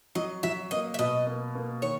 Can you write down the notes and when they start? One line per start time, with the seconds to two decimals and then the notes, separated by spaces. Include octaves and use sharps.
0.15 F#3 D#5
0.43 F#3 E5
0.71 A#3 D#5
0.94 E5
0.99 B2 D#5
1.27 A#3
1.55 A#3
1.82 D#3 C#5